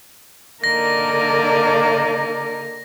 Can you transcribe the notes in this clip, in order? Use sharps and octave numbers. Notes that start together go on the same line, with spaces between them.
D3 A#3 D#4 A#4 D5 A#6